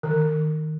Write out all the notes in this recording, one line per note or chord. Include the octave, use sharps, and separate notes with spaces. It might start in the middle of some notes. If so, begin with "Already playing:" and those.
D#3